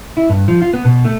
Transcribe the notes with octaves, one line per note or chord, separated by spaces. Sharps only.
E4
G2
F3
F4
B3
B2
A3